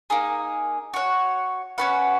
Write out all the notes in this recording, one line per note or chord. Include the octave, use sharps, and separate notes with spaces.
A#3 D#4 G#4
F#4 C#5 F#5
C#4 F#4 B4 F#5